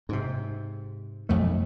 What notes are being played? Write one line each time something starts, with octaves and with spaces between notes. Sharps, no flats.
G#2 C3
B1 F2 A3